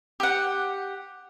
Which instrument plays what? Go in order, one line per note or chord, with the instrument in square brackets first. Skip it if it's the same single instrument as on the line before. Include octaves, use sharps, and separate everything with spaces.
[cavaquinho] G4 F#5